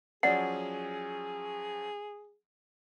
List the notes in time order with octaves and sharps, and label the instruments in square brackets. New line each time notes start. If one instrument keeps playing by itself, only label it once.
[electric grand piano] F3 F#3 C#4 [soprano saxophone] G#4 [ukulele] D5 [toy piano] F#5